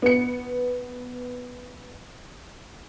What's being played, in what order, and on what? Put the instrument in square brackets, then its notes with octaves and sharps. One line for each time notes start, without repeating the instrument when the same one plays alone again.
[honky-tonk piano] B3 C#7